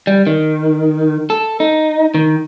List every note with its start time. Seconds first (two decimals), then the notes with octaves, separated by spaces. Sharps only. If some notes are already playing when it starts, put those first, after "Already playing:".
0.07 G3
0.27 D#3
1.30 A4
1.60 D#4
2.15 D#3